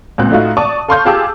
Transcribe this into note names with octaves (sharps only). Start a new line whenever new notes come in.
C#2 A#2 C4 F#6
A2 A3 D#4 F4 F#4
D5 A5 C#6 D#6
A4 F5 C6 C#6 F6 G6
F4 G4 G#4 A5 D6 E6